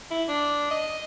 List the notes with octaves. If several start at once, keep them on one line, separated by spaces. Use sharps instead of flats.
E4
D4
D#5